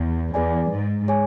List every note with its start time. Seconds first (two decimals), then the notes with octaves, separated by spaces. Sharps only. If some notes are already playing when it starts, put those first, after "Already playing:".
Already playing: E2
0.34 E2 G#4 B4 D5 G#5
0.72 G#2
1.08 G#4 C#5 G#5